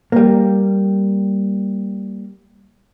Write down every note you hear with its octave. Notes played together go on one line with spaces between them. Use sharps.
G3 A#3